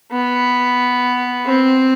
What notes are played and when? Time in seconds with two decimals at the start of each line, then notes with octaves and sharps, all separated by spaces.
0.12 B3
1.45 C4